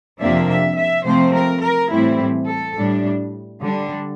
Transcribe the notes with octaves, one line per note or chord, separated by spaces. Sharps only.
F2 C3 F3 A#3 D4 E5
E5
E5
C3 F3 A3 C4 C5
A#4
A#4
A2 E3 G3 C4 E4
A4
A2 G3 D4
D3 G3 D4